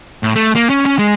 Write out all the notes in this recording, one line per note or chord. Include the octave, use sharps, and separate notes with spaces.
A2
A3
A#3
C#4
C#4
G#3